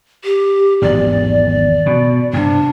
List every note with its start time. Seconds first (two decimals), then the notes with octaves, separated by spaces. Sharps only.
0.24 G4
0.82 G#1 E2 G#2 D5
1.86 B2
2.33 G2 C3 D4